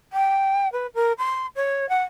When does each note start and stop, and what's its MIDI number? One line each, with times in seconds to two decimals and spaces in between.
0.13 0.71 79
0.72 0.86 71
0.94 1.12 70
1.18 1.46 84
1.56 1.89 73
1.89 2.03 78